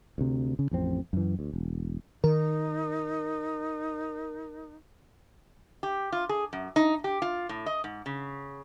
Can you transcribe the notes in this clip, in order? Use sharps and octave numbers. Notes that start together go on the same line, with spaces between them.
D2 C3
C#3
A1 F2 C4
F#2 E3
D2
E1
D#3 D#4 A#4
G4
F4
G#4
F#2
D#4
G4
F4
A2
D#5
G#2
C#3